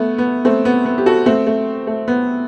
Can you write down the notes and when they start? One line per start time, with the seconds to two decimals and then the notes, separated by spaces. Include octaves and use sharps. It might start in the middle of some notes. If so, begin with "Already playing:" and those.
Already playing: A3 B3
0.18 B3
0.45 A3 C4
0.65 B3
0.85 B3
0.98 G4
1.06 F#4 A4
1.26 A3 C4
1.47 A3
1.87 A3
2.08 B3